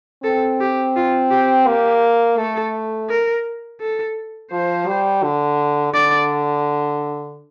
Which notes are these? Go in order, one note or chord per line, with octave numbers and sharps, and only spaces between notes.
C4 A4
G4
F4
G4
A#3 G4
A3 A4
A#4
A4
F3 C5
G3
D3
D3 D5